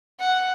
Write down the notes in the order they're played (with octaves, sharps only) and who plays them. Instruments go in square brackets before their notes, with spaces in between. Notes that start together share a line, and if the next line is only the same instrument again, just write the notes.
[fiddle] F#5